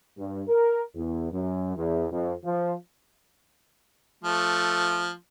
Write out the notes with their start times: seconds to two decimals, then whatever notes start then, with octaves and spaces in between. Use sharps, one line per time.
0.18 G2
0.48 A#4
0.95 E2
1.32 F#2
1.76 E2
2.11 F2
2.44 F3
4.24 F3 A3